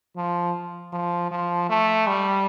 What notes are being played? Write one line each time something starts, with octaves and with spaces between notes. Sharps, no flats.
F3
F3
F3
A3
G3